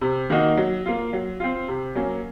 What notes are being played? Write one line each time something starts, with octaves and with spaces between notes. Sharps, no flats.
C3
D#3 A#3 D#4 F#4
F#3
A#3 F4
F#3
C4 F4
C3
F#3 A#3 C#4